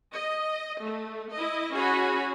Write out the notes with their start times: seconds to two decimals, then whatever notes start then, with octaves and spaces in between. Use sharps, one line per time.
0.12 D#5
0.82 A3
1.32 E4 D#5
1.74 C#4 F#4 G#4 C#5 G#5 B5